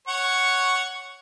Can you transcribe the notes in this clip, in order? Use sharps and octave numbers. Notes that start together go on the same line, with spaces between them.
C#5 F#5 C#6